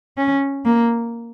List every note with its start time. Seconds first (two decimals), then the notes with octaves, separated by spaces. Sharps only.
0.17 C#4
0.65 A#3